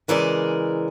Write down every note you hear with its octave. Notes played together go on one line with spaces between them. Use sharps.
C#3 E3 G#3 A#4 D5